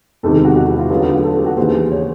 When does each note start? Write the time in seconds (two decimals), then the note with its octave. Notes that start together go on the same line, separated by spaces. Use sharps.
0.23 E1 E2 C3 D#3 A4
0.45 F#4
0.56 F#4
0.67 E4
0.79 F4
0.90 D2 D3 F#3 B3 D4 F4
1.01 F#4
1.13 F4
1.24 A4
1.36 G4
1.46 F#4
1.57 D#2 C#3 E3 C5
1.91 C#5